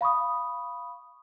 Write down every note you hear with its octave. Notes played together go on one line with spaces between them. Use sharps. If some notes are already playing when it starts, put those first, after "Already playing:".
F5 B5 C#6 D#6